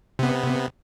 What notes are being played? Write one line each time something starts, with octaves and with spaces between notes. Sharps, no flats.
C3 B3